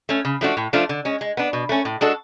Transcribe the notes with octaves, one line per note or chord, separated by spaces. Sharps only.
A3 C#4
C#3
F3 A3 D4 F#4
A2
F3 A3 D4 F4
D3
G#3 C#4
G#3
B3 D4
B2
A3 C#4
A2
G#3 D4 F#4 A4